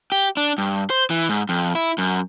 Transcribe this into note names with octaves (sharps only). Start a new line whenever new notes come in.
G4
D4
G2
C5
E3
G#2
F2
E4
F#2